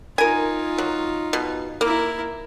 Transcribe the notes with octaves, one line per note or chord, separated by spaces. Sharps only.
D#4 F4 A#4 G#5
F#3
B2
A#3 E4 A#4